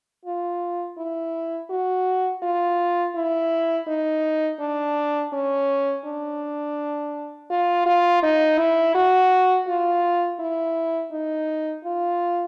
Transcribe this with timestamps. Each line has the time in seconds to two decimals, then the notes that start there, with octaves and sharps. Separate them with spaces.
0.25 F4
0.98 E4
1.70 F#4
2.43 F4
3.16 E4
3.88 D#4
4.60 D4
5.33 C#4
6.06 D4
7.50 F4
7.86 F4
8.23 D#4
8.58 E4
8.95 F#4
9.68 F4
10.40 E4
11.12 D#4
11.84 F4